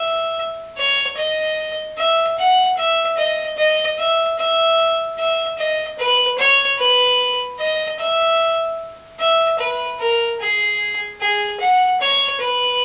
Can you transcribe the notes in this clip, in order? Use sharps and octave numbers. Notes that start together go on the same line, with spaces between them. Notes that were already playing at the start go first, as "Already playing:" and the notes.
Already playing: E5
C#5
D#5
E5
F#5
E5
D#5
D#5
E5
E5
E5
D#5
B4
C#5
B4
D#5
E5
E5
B4
A#4
G#4
G#4
F#5
C#5
B4